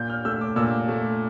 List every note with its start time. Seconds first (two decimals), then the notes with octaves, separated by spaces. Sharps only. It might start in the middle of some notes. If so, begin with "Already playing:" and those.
Already playing: A#2 G6
0.10 F6
0.25 A3 E6
0.41 D6
0.56 A#2 E6
0.88 A3